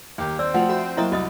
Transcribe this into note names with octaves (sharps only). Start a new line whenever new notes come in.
D#2 A#3 G4
C4 D5 E6
F3 A3 F4 F#4 F#5
F#4 E5
F#3 A#3 E4 C5 D#5 E5 G5 D#6
C2 F#4 D#5 D#6